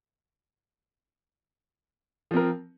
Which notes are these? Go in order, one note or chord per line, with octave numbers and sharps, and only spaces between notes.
F3 C4 A#4